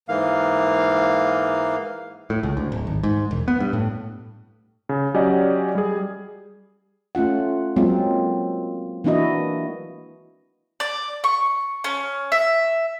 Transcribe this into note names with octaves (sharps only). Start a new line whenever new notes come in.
G#2 E3 A#3 F5
A2
C#2
D2
D1
G#1
G#2
E1
B3
G2
A2
C#3
F#3 C#4 G4 D5 D#5 F#5
G3 G#4
A3 C#4 F4 F#5
F#3 G#3 A#3 C4 F4
E3 A#3 D4 E4 F#4 D#5
D5
C#6
C#4
E5